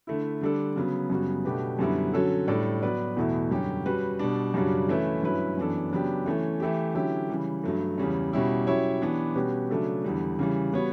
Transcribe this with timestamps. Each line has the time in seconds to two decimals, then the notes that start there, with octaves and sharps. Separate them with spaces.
0.07 D3 A3 E4
0.41 D3 G3 D4 A4
0.76 C#3 F#3 B3
1.10 F#2 C#3 G3 B3 F#4
1.45 B2 A3 D4 G4 B4
1.79 F#2 D3 G3 B3 E4
2.14 D3 F#3 C#4 F#4 A4
2.48 A2 G3 D4 A4 D5
2.82 F#3 B3 F#4 B4 D5
3.17 E2 B2 A3 E4
3.51 F#2 D3 G3 C#4 G4
3.86 G3 C#4 F#4 B4
4.19 B2 G3 D4
4.54 F#2 C#3 G3 D4 F#4
4.88 E3 A3 C#4 E4 B4
5.23 G2 F#3 C#4 E4 B4
5.57 F#2 E3 B3 D4 A4
5.91 C#3 F#3 B3 D4 G4
6.26 E3 A3 C#4
6.60 E3 A3 E4 G4
6.95 D3 F#3 C#4 E4 G4
7.29 C#3 E3 G3
7.64 G2 F#3 A3
7.98 E2 C#3 G3 C#4
8.32 B2 G3 C#4 E4 G4
8.67 F#3 C#4 E4 G4 C#5
9.02 E3 B3 D4 G4 C#5
9.35 B2 G3 C#4 G4 B4
9.70 C#3 F#3 A3 D4 A4
10.04 E2 D3 G3
10.39 C#3 E3 G3
10.73 G3 B3 F#4 C#5